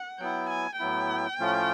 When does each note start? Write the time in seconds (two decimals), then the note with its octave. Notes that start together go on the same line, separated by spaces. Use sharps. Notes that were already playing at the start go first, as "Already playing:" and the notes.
Already playing: F#5
0.19 F#3 B3 E4 G5
0.50 G#5
0.79 A2 F#3 B3 E4 G5
1.39 A2 F3 A3 C#4 F4